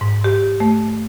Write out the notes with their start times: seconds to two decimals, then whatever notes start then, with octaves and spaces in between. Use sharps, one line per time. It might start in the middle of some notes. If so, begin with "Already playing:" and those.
0.01 G#2
0.24 G4
0.60 A3